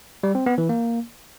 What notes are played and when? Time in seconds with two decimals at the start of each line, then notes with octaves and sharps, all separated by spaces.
0.23 G3
0.35 C4
0.46 B3
0.58 E3
0.69 A#3